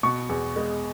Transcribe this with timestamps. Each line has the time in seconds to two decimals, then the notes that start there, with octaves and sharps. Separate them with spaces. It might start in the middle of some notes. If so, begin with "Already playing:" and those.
0.03 B2 C#6
0.29 E2
0.56 G#3